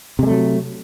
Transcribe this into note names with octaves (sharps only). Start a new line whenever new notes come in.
C3 F#3 G#3 A3